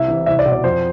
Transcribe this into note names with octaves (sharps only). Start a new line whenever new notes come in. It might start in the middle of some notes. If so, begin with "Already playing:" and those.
Already playing: C2 E5
C3 E3
C2 E5
D5
B2
D5
F2 C5